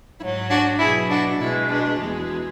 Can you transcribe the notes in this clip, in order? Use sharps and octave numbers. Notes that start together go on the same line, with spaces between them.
G#2 F#3 E4
D4 F#4
B2 F#3 E4 G#4
D4 F#4
B2 G#3 E4
D4
E2 B2 G#3